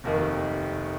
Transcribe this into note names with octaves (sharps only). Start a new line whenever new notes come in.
F1 D#2 D#3